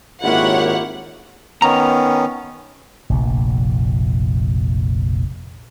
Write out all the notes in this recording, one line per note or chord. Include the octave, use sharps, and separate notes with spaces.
G#1 A#3 E4 F4 G4 A#4 C#5 F#5
D#3 B3 C#4 A#5
F1 A#1 A#2